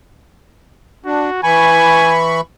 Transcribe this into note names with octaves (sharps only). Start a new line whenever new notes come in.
D4 F#4
E3 G#5 B5 C#6